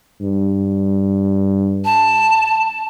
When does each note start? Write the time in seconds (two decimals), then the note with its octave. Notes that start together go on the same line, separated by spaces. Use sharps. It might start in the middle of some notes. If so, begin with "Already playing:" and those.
0.21 G2
1.85 A5